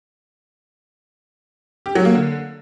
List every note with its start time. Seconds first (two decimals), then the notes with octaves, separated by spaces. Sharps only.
1.86 G4
1.95 F#3
2.05 A#3
2.15 D3